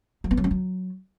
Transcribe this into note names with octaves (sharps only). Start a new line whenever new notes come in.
F#3
B3
F#3
C#4
F#3